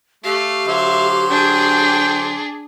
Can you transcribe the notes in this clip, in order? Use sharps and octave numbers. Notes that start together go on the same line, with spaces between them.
A3 G4 F5
D3 F#3 C5 E5
D4 G#4 G5